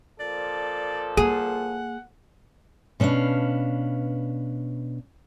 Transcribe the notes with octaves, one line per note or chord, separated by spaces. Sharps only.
A#2 F3 A4 D5
A#3 G#4 F#5
B2 C#4 D4 B4 F5